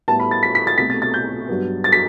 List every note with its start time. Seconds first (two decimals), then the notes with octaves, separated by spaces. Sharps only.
0.08 A2 G3 B3 A5
0.20 B5
0.31 A6
0.43 B6
0.55 B6
0.67 A6
0.78 C2 B2 A3 B6
0.90 A6
1.02 A6
1.14 G6
1.49 G2 F#3 B3
1.84 A6
1.92 B6